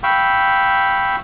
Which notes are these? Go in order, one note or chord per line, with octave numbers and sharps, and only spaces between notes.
F5 G5 B5 C#6 E6